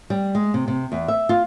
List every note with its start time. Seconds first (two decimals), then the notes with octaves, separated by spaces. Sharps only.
0.10 G3
0.35 G#3
0.54 C3
0.68 C3
0.92 E2
1.08 E5
1.29 F4